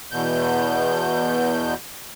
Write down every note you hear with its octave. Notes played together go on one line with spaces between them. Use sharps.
E2 B2 G6